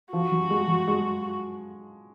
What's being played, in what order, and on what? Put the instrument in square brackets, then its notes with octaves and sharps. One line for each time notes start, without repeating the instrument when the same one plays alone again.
[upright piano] F3 [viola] F#4
[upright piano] F#3
G#3
F#3
G#3